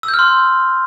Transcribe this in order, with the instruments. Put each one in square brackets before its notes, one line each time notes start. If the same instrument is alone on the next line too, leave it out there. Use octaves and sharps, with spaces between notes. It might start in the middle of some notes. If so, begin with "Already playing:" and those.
[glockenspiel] E6
G6
F6
C6